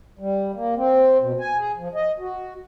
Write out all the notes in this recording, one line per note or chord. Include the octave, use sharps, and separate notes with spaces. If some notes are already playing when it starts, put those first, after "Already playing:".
G3
A#3
C4
B2
G#5
G#4
F3
D#5
F#4